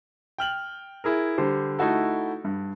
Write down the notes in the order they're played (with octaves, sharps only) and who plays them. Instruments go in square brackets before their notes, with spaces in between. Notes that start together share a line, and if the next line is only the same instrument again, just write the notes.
[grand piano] G5 F6 F#7
E4 G#4 A#4
D3 G3 G4 C5
A3 D#4 E4 F#4 A4
G2